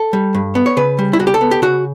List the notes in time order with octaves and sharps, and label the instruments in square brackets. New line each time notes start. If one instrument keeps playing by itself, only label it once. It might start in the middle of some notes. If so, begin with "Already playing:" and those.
Already playing: [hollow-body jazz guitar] A4
G3
G2
B3
C#5
C#3 B4
G3
E4
C#2 F#4
G4
A4
B3
G4
C#3 F#4